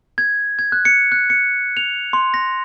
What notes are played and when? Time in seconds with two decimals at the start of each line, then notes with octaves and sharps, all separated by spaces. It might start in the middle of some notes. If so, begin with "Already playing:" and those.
0.18 G#6
0.59 G#6
0.72 F#6
0.85 C#7
1.12 F#6
1.30 C#7
1.77 F7
2.13 C6
2.34 A#6